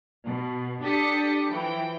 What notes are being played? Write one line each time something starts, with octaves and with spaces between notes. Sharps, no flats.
B2
D4 G4 A4 D#6 B6 C#7
E3 F3 G5